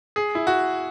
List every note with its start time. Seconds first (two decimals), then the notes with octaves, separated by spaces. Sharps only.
0.16 G#4
0.35 E4
0.47 F#4